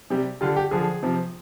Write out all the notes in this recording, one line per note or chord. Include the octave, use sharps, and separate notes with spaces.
C3 G3
D3 G3 F4
G4
D3 F3 G#4
C3 F3